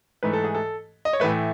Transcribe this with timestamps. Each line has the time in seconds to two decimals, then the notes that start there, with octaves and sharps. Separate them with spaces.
0.23 G#2 E3 A3 B4
0.33 A4
0.44 G#4
0.55 A4
1.05 D#5
1.13 C#5
1.20 A2 E3 A3 B4